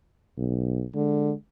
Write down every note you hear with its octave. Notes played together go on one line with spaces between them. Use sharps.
B1
D3 G#3